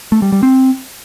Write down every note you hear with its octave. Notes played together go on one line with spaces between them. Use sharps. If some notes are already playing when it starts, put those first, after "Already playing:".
A3
G3
G3
C4